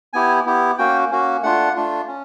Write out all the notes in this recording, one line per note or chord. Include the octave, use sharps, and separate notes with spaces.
B3 E4 G4 G#5
B3 E4 G4
A#3 C#4 F#4 G5
A#3 C#4 F#4
A3 D4 F4 F#5
A3 D4 F4
C#4